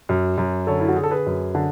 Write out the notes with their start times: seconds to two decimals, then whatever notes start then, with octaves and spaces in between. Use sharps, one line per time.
0.09 F#2
0.38 F#2
0.67 D3 A4 C#5
0.80 E4
0.88 F#4
0.96 D3 G#4
1.04 A4
1.11 G#4 B4
1.26 F#2
1.55 D3